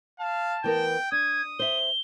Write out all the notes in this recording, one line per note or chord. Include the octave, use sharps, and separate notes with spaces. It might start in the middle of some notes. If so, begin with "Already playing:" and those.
F5 A5
E3 B3 A#4 G5
D4 D#6 G#6
C5 E5 G7